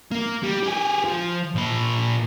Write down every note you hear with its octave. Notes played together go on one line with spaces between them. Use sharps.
A#3
G3
G4 G#4
F3
A#2 B5